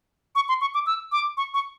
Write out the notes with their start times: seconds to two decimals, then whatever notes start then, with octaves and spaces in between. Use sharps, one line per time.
0.35 C#6
0.49 C6
0.61 C#6
0.74 D6
0.86 E6
1.12 D6
1.37 C#6
1.54 C#6